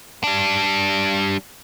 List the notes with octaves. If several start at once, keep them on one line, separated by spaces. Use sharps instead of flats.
G3 D4